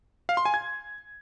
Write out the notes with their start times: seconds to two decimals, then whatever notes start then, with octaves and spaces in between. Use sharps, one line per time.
0.29 F5
0.37 C6
0.45 G#5
0.54 G#6